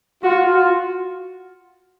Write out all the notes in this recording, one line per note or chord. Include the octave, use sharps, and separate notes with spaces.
F4 F#4
F#4